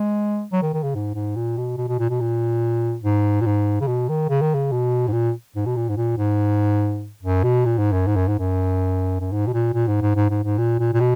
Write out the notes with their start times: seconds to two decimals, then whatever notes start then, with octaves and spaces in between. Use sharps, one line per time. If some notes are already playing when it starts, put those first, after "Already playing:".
Already playing: G#3
0.52 F#3
0.62 D#3
0.73 D#3
0.83 C#3
0.95 G#2
1.15 G#2
1.36 A#2
1.57 B2
1.77 B2
1.88 B2
1.99 A#2
2.10 B2
2.21 A#2
3.04 G#2
3.41 A#2
3.46 G#2
3.80 C#3
3.87 B2
4.09 D#3
4.29 C#3
4.41 D#3
4.54 C#3
4.72 B2
5.08 G#2
5.13 A#2
5.56 G#2
5.66 B2
5.76 A#2
5.89 G#2
5.97 A#2
6.18 G#2
7.23 F#2
7.43 B2
7.65 A#2
7.78 G#2
7.92 F#2
8.07 G#2
8.17 F#2
8.28 G#2
8.39 F#2
9.20 F#2
9.32 G#2
9.47 B2
9.53 A#2
9.74 A#2
9.88 G#2
10.02 G#2
10.15 G#2
10.30 G#2
10.44 G#2
10.58 A#2
10.79 A#2
10.94 A#2
11.00 B2